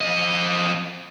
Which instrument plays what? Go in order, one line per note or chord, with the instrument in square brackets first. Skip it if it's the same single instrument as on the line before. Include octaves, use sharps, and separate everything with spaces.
[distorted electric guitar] F2 D#5